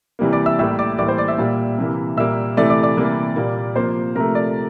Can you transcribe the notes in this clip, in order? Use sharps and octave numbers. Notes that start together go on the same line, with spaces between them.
C3 E3 G3 A#3
D5 D6
E5 E6
A2 G3 A#3 E5 E6
D5 D6
A2 E3 G3 A#3 D5 D6
C5 C6
D5 D6
E5 E6
A#2 G3 A#3
C3 E3 A#3
A#2 G3 A#3 E5 E6
C3 E3 A3 D5 D6
D5 D6
D5 D6
C3 E3 G3 A#3
A#2 G3 A#3
C3 F3 A#3 C5 C6
C3 F3 A3 A#4 A#5
D5